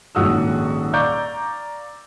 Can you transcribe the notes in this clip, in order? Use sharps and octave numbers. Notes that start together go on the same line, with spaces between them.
D#1 A#1 G#2 F#4 D#6 E6
D5 F5 A#5 C#6 D6 G6